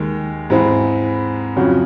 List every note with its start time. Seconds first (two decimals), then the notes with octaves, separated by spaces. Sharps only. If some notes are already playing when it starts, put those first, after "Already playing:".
Already playing: D#2 D#3 G#3
0.50 G#2 E3 G#3 C4 E4
1.56 F2 C#3 F#3